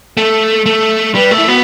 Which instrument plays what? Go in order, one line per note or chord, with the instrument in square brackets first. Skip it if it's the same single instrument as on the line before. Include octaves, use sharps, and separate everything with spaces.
[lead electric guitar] A3 [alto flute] A4
[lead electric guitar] A3
[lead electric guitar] G3 [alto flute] B4
[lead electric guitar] A3
[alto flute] E4
[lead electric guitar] B3 [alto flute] F#4